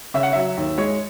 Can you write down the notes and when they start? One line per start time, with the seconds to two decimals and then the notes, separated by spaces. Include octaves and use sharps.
0.14 C#3 E5
0.23 F#5
0.33 F#3 E5
0.57 D#2
0.78 G#3 C#5